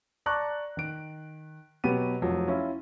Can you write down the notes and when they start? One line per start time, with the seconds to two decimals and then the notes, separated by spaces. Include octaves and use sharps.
0.26 D5 A5 A#5 C#6 D6 F#6
0.77 D#3 D7
1.84 B2 F#3 B3 G4 D#7
2.22 F1 F3 F#3
2.48 C#4 E4 F4